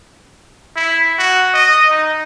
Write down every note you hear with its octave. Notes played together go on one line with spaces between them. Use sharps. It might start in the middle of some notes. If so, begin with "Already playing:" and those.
E4
F#4
D#5
D#4